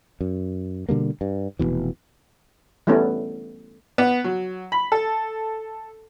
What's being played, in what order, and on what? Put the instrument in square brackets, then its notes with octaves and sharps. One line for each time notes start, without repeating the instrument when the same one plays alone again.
[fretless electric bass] F#2
B2 D3 G3 A#3
G2
F1 F#2 B2 E3
[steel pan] E3 G3 A3 B3 C#4
[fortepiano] B3
F#3
B5
A4